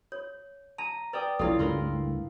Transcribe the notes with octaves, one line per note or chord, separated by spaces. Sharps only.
C#5
A5 A#5
B4 D5 G5 D#6
A#1 C#4 E4 F4 A4 F5
C#2 G2 A3 A#4 B4 C6